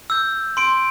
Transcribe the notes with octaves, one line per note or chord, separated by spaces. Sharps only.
E6 G6
C6 D7